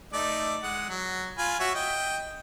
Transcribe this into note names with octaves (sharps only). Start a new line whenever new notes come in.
A3 D#4 D5
G#3 F#5
F#3
F4 G#5 B5
F#4 C#5 E5
D#5 G5